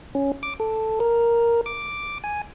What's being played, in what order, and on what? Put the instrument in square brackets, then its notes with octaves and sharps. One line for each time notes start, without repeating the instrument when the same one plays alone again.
[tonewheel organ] C#4
D6
A4
A#4
D6
G#5